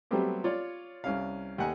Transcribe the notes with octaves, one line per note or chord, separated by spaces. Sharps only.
F#3 G3 A3 B3 C4 G4
F4 C#5 D5
C2 C#4 F5
D#2 F#5 G#5